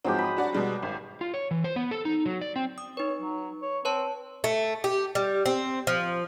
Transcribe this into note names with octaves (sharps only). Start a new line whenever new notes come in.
G#2 F3 F#3 G#3 C4 G4
B5 D#6
D4 F#4 D5
B2 G3 G#3
G#1
F4
C#5
E3
C5
B3
A4
D#4
F#3
D5
C4
D#6
D#4 B4 C#5
F#3
C#5
C4 B4 C#5 A5
A3
G4
G3
C4
F3